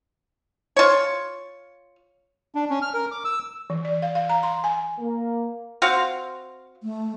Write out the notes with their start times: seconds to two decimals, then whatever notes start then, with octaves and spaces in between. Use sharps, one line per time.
0.76 F4 C#5
2.55 D4
2.70 C#4
2.82 F6
2.94 A#4
3.11 D6
3.25 E6
3.70 E3
3.85 D5
4.02 F5
4.15 F5
4.30 A#5
4.43 C6
4.64 G#5
4.98 A#3
5.82 C4 F#4 F5
6.83 A3